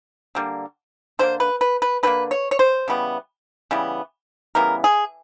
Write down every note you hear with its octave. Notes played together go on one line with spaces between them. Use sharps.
D3 G3 A#3
D3 G3 A#3 C5
B4
B4
B4
D3 G3 A#3 B4
C#5
C#5
C5
C#3 E3 G3 B3
C#3 E3 G3 B3
C#3 E3 G3 B3 A#4
G#4